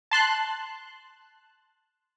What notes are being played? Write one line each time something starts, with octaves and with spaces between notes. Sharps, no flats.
A5 C6 F#6